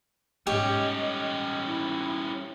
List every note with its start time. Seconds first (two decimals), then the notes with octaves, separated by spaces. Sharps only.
0.47 G#2 G3 B3 C#4 G4 C#5 D#5
1.66 E4